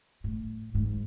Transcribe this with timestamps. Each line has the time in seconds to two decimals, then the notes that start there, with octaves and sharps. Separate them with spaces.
0.24 A2
0.75 G#2